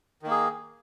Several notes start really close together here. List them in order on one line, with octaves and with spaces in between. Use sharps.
D#3 A#3 G#4